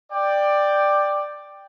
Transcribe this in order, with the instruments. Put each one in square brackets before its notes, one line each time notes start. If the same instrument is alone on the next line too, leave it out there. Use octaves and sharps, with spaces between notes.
[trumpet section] D5 G5